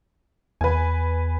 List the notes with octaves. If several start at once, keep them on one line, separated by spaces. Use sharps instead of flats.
E2 B4 G#5